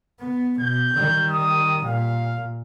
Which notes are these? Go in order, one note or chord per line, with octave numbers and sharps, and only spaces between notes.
B3
B2 G6
D#3 G3
D#6
A#2 F5